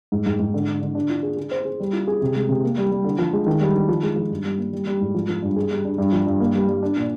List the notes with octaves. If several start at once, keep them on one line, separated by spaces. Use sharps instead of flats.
G#2
G#2
G#2
D3
D3
D3
D4
F4
G#4
G#4
C5
G#4
G3
F4
G#4
C3
G#3
C3
A#3
G3
G3
D3
F3
G#3
D#3
G3
D#3
F3
G#3
F3
G2
G3
A#3
G3
G3
G#2
F3
F3
G2
G#4
G3
D4
G2
F3
G2
A#3
G3
G3
D4
A#2